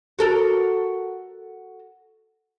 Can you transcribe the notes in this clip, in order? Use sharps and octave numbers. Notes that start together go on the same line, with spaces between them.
F#4 A4 A#4